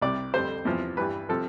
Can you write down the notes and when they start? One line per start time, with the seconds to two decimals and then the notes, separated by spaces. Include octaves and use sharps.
0.01 C2 C3 G3 D5
0.34 F2 D3 G3 C5
0.65 E2 C3 F3
0.97 G2 E3 G3 B4
1.29 C3 F3 A4